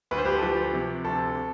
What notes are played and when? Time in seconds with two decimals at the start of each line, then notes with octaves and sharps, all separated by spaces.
0.11 D2 B4
0.18 C5
0.25 G4 B4
0.38 A4
0.42 F3 G4
0.73 C3
1.04 D2 A4